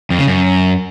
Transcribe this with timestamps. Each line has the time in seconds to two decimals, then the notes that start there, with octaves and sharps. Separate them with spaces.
0.10 F2
0.19 C#3
0.27 F#2